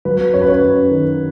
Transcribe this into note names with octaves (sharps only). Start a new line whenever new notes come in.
F#3 B4
F#2 C#5
B4
C#5
F#2
D#3